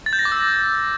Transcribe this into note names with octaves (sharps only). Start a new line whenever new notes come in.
A6
G6
A#6
D6
E6